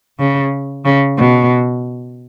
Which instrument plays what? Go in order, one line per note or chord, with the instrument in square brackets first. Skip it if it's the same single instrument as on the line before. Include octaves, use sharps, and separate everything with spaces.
[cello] C#3
C#3
B2